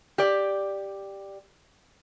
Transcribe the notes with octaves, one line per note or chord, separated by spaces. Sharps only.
G4 D5